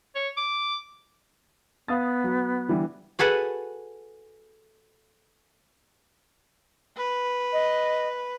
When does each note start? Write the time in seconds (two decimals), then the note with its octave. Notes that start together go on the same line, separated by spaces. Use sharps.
0.15 C#5
0.37 D6
1.88 B3 F5 D#6 A6
2.24 F#3
2.68 D3 E3 G3
3.19 F#4 G#4 A4 B4 F#5
6.97 B4
7.53 D#5